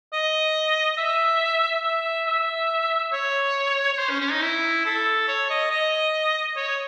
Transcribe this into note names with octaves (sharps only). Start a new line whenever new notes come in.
D#5
E5
E5
E5
C#5
C#5
C5
C#4
C#4
D#4
E4
A4
C#5
D#5
D#5
C#5